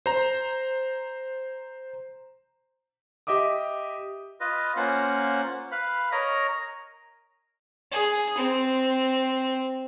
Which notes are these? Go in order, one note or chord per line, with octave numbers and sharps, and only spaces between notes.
C5 A#5
G4 D#5 E5 D6 D#6
F4 B4 D#5
A#3 C#4 F4 C5 F#5
B4 F5 B5
A#4 C#5 D#5 A#5
G#4
C4